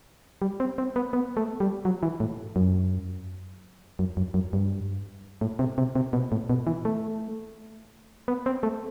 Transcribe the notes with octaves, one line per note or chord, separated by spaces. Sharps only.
G3
C4
C4
B3
B3
A3
G3
F#3
E3
A2
F#2
F#2
F#2
F#2
G2
A2
C3
C3
C3
B2
A2
B2
E3
A3
B3
C4
A3